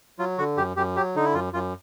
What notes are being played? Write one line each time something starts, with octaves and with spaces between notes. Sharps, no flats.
F#3 F4
D3 F#4
F#2 G4
F#2 G4
F#3 G4
D3 D#4
E4
F#2 F4
F#2 F4